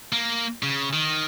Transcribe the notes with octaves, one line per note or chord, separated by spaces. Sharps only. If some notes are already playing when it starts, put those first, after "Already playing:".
A#3
C#3
D#3